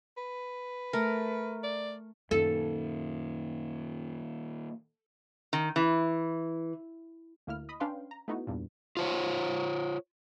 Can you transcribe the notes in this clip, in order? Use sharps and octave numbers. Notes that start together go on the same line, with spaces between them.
B4
A3 A#4
D5
F#2 A#2 D#3 A4
D#3
E3
D2 A#3 E4 F6
D#5 B5 D#6
C#4 D4 B4 F5 G5 C6
A#5
A3 B3 D#4 E4 F#4
E2 G2 A#2
F4 C5 C#5